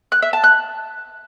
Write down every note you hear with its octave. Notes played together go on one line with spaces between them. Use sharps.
F#6
E5
A5
F#6